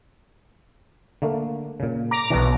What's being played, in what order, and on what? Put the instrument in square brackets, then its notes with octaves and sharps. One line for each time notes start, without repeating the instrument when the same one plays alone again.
[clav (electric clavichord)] D3 A3 A#3
A#2 C#3
[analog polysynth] A#5 D6
[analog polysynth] B1 B2 [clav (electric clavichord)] E3 D4